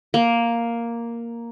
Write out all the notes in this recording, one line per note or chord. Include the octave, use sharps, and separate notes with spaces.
A#3